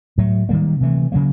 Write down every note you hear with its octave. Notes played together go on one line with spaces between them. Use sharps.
A2 F#3 A3
D#3 G3 A#3
C3 E3 A3
C#3 F#3 A#3